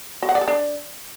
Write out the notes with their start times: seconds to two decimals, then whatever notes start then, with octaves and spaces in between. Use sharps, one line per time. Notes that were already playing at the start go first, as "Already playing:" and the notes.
0.22 F#4
0.29 F#5
0.35 D5
0.41 A4
0.48 D4